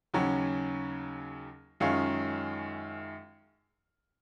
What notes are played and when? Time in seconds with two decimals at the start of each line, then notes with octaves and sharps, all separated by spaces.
0.14 D#2 C#3 F#3 C#4
1.80 F#2 D#3 G#3 C#4 F4